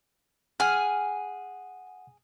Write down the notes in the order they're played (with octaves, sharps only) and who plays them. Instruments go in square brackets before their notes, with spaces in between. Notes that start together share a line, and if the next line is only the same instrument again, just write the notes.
[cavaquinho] G#4 [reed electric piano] F#5 [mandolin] G#5 F6